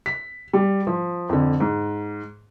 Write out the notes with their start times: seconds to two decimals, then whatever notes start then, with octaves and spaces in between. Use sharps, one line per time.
0.06 B6
0.53 G3
0.87 F3
1.29 F2 D3
1.60 G#2